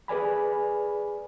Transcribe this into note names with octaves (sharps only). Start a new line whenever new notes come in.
G#4 B4 D5 G#5 B5